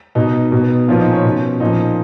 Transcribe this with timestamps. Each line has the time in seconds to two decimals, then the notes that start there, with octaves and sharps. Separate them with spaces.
0.15 B2 D#4
0.52 B2
0.88 A#2 F3 F4
1.00 D#4
1.12 C#4
1.24 B2
1.60 A#2 F3 D#4